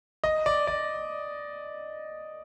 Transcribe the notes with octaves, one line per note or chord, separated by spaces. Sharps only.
D#5
D5
D5